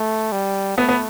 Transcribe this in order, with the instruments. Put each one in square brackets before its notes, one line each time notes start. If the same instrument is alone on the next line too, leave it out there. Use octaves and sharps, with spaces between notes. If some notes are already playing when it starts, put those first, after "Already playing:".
Already playing: [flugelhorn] A3
G3
[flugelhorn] A3 [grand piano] B3
[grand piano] B3